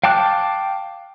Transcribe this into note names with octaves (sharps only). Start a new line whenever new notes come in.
F5 G5 A5 D6 F#6